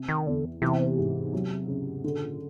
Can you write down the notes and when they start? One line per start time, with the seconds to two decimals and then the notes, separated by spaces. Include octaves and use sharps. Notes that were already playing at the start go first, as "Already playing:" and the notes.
Already playing: C3
0.09 D#3
0.26 E2 D3
0.62 C3 E3
0.97 G#2
1.33 F#3
1.68 C#3
2.04 D3
2.14 B2
2.21 A#2